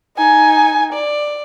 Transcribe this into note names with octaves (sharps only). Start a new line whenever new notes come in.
D#4 G#5
D5